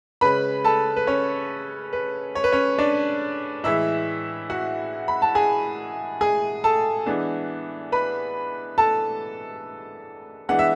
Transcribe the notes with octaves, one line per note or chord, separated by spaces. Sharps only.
C#3 G#3 C#4 B4 B5
A4 A5
B4
C#4 C#5
B4
C#5
B4
C#4 C#5
D4 D5
A2 E3 G#3 E4 E5
F#4 F#5
B5
A5
G#4 G#5
G#4 G#5
A4 A5
E3 G#3 B3 D4
B4 B5
A4 A5
E3 G#3 B3 D4 F#5
E5